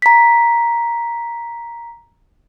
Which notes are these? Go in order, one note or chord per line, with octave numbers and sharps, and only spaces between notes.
A#5 B6